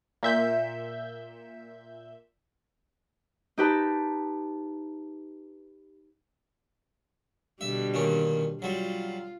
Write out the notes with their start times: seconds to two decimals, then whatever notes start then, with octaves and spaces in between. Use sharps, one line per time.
0.23 A#2 E5 G6
3.58 D#4 G4 B4 A5
7.61 B2 D3 G3 E5
7.94 A#2 D#3 C#4
8.62 F#3 G3 F4